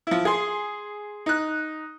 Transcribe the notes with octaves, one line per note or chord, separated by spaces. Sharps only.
F3 E4
G#4 C6
D#4 F#6